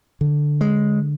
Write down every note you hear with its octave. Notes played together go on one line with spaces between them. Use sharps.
D3
G#3